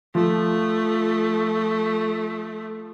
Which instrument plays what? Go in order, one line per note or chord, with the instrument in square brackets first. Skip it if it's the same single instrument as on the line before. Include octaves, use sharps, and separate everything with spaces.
[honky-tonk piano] F3 [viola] A3